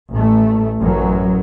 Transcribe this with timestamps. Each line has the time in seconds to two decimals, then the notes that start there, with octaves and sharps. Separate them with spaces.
0.12 A1 A3
0.81 A1 F#2 F#3